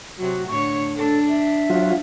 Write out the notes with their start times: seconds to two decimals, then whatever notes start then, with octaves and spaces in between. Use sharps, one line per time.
0.18 C3 F#3 F#4
0.48 A2 D3 C#5 C#6
0.97 D4 A4
1.29 E5
1.70 F#3 F4